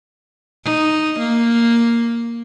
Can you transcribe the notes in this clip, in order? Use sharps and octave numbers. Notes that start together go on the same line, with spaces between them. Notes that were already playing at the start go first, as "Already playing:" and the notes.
D#4
A#3